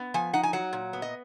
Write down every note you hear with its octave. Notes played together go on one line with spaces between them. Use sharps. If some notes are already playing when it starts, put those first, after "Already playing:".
Already playing: B3
F3 G#5
D#4 F#5
G#5
F#3 F#5
A#2
B3
D#5